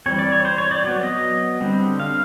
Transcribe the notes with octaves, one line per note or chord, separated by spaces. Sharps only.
E3 G3 C4 C#5
D5
C#5
C5
C#5
D5
F#3 B3
D#5
D3 G3 C4
F5